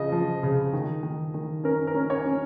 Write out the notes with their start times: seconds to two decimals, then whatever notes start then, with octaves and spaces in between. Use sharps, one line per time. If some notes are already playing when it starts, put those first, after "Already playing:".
Already playing: C#3 F3 D#5
0.12 F3
0.43 C#3
0.73 D#3
1.03 D#3
1.34 D#3
1.64 C#4 A#4
1.87 A#4
1.95 C#4
2.10 C#5
2.26 C#4